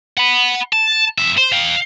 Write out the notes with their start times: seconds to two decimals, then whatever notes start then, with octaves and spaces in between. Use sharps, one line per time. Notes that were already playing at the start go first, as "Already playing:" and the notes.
0.18 F#5 B5
0.73 A5
1.18 F2 E5
1.37 C5
1.52 F5 G5